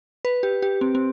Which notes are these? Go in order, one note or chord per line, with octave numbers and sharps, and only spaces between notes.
B4
G4
G4
C4
C4